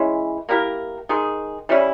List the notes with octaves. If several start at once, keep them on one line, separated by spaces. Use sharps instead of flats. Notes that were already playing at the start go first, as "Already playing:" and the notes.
Already playing: E3 G#3 C#4
A#3 E4 G4 A#4
D#3 G#3 D#4 G#4
E3 G3 C#4 E4